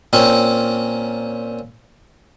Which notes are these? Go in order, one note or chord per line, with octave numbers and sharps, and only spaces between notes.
A#2 C4 C#4